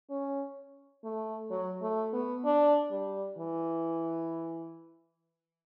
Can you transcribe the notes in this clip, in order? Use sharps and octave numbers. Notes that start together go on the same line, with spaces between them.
C#4
A3
F#3
A3
B3
D4
G3
E3